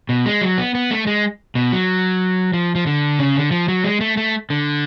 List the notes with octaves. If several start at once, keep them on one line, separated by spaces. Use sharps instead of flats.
B2
G#3
F#3
B3
B3
A3
G#3
B2
F#3
F3
F3
D3
C#3
D3
F3
F#3
G#3
A3
A3
D3